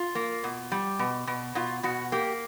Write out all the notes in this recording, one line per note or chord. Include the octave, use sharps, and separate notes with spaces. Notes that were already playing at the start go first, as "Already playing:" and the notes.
Already playing: F4
A#3
B2
G3
B2
B2
B2 F4
B2 F#4
A#3 G4